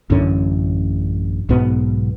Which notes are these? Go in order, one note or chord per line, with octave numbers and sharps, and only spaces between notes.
A1 F#2 D3 C#4
B1 G#2 B2 B3